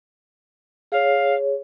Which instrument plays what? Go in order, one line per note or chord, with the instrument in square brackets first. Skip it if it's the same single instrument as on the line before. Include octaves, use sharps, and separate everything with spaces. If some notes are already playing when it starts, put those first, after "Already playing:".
[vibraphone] G#4 C#5 [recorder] F5